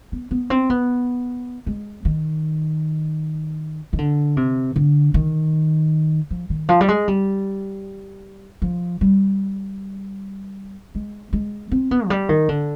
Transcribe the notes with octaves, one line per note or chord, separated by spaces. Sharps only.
B3
B3
C4
B3
G#3
D#3
D#3
D3
C3
D3
D#3
F3
D#3
F3
G3
G#3
G3
F3
G3
G#3
G#3
C4
B3
F3
G3
D#3
D3